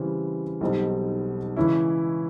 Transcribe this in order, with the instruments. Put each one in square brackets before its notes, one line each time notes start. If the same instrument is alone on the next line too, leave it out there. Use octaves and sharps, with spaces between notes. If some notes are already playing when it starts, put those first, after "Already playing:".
Already playing: [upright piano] C#3 E3 G3 C4
B1 B2 G3 C4 D#4
C#3 E3 G#3 C#4 E4